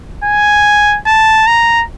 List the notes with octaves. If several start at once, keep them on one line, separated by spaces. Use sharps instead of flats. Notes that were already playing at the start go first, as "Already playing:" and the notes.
G#5
A5
A#5